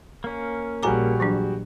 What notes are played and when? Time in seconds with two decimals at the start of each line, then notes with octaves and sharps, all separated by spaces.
0.24 A#3 C#4
0.83 A#1 G3 F#4 G#4 G#5 A#5 D6
1.20 E3 F#3 D4